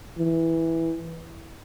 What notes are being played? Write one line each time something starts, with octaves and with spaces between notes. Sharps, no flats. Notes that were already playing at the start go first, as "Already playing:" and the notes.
E3